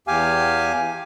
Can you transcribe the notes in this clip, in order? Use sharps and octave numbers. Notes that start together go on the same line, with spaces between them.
E2 G4 F5 G#5